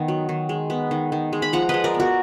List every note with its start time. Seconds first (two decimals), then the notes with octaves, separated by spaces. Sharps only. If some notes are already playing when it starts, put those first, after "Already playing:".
Already playing: D#3 B3
0.08 F#3
0.29 D#3
0.49 G#3
0.70 B3
0.91 D#3
1.12 D#3
1.33 G#3
1.42 B5
1.53 F3 F#5 A#5
1.69 G#3 B4 D#5
1.84 A#4 D5
1.94 B3
2.00 F#4 A#4